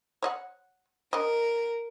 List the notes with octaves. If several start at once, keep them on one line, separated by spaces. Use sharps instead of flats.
C#5 D#5 F#5
D4 A#4 D#5